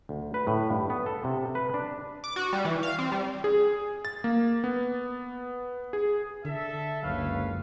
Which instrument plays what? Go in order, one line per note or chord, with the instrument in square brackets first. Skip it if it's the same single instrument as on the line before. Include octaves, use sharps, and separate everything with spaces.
[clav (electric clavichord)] D2
B4
A2
G2
B3
A4
C3
B4
D4
[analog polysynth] D6
F#4
G3
E3
F5
C4
G3
[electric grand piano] G#4
A6
A#3
B3
G#4
[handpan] D3 [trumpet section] A4 E5
[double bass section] F#1 C#2 F#2 [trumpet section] B4 C#5 F5